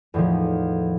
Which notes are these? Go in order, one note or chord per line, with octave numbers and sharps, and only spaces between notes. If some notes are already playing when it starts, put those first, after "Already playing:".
E2 A2 D#3 F3